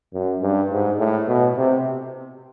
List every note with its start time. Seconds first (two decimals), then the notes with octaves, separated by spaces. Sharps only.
0.14 F#2
0.42 G2
0.71 G#2
0.99 A2
1.28 B2
1.57 C3